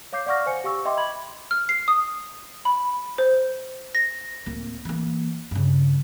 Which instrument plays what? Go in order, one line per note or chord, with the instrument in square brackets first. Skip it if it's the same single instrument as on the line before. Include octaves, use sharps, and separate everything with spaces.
[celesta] C#5 F5 D6 G6 C7
D5 F5 F#5 C#6 F6 A#6
C5 G#5 C#7
G4 F5 C#6 E6
D#5 E5 G5 C6 D6
B5 G#6 F#7
[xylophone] F6
C7
D#6
B5
C5
A#6
[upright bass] D1 A#3
E3 A#3
G2 C#3